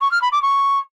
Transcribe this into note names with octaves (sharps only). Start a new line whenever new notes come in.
C#6
F6
B5
D6
C#6